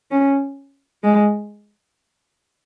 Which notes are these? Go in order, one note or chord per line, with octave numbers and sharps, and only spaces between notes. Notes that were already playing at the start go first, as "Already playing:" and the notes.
C#4
G#3